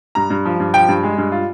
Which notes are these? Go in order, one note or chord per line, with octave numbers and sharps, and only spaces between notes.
G2 A#5
G2
F3
G2
F3 G5
G2
G#3
G2
F4